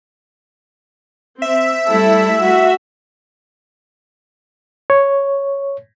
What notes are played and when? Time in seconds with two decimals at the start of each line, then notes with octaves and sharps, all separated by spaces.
1.42 C4 E5
1.88 G3 A3 E4 A4
2.42 F#4
4.90 C#5